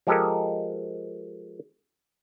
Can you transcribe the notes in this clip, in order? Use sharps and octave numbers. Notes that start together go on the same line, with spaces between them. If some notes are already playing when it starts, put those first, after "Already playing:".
F3 G#3 G4 A4 A#4 D#5